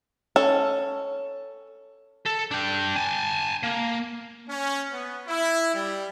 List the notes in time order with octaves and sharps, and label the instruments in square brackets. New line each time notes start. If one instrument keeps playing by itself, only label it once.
[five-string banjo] C#4 A4
[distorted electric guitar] A4
D4 G5
G#5 A5
A#3
[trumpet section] C#4
B3
E4
G3